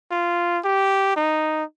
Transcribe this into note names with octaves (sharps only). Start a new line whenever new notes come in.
F4
G4
D#4